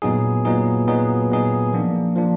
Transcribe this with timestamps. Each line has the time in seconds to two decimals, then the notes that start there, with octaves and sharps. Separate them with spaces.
0.02 A#2 F#3 B3 D#4 G#4
0.45 A#2 F#3 B3 D#4 G#4
0.88 A#2 F#3 B3 D#4 G#4
1.30 A#2 F#3 B3 D#4 G#4
1.73 F3 A#3 D4
2.16 F3 A#3 D4